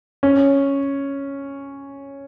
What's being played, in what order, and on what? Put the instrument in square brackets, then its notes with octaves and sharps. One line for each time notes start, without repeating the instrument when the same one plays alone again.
[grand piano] C#4